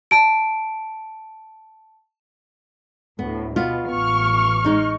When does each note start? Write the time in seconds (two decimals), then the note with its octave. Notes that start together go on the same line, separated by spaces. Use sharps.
0.11 A5 D7
3.19 D2 A2 B3
3.56 B2 B3 F4
3.91 A1 C#6 F6
4.64 G#3 D#4